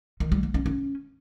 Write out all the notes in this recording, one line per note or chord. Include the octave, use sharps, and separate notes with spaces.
D#3
G3
A#3
C#4
C#4